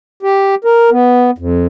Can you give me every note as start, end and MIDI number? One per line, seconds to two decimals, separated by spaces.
0.23 0.55 67
0.64 0.90 70
0.91 1.31 59
1.38 1.67 41